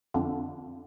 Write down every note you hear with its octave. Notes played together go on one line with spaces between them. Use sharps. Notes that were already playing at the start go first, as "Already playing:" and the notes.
F2 D3